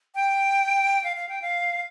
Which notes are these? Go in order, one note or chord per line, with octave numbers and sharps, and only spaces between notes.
G5
F5
F5
G5
F5